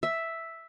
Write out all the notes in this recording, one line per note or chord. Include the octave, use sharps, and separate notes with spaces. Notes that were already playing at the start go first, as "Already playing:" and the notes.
E5